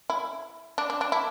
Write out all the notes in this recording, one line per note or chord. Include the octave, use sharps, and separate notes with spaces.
E4
D4
D4
D4
E4